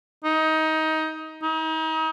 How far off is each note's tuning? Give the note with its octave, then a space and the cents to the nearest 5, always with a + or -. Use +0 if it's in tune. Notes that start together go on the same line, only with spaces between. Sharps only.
D#4 +20
D#4 +35